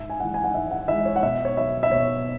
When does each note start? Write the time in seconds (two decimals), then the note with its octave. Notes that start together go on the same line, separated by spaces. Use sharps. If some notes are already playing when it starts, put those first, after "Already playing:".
Already playing: G#2 E5
0.10 G#5
0.20 E3 G#3 F#5
0.34 G#5
0.44 F#5
0.54 G#2 E5
0.71 F#5
0.88 E3 G#3 E5
1.05 C#5
1.16 F#5
1.23 B2 E5
1.45 C#5
1.57 F#3 E5
1.83 E5
1.91 B2 C#5